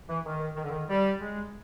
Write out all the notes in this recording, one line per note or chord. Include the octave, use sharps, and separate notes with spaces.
E3
D#3
D#3
D3
D#3
G3
G#3